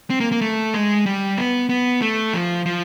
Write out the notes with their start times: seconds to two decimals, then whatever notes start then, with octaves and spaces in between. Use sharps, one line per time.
0.10 C4
0.20 A#3
0.32 A#3
0.41 A3
0.74 G#3
1.06 G3
1.38 B3
1.69 B3
2.02 A3
2.33 F3
2.66 F3